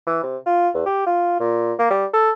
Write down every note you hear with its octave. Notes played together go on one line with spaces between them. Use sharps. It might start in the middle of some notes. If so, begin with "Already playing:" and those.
E3
C3
F4
E2
G4
F4
A#2
A#3
G3
A4